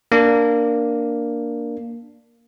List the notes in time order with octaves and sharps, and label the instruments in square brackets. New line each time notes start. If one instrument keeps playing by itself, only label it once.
[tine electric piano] A#3 D4